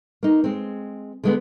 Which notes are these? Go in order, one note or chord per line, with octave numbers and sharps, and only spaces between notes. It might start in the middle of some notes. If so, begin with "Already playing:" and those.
A#3 D#4
G#3 C4
D3 G#3 B3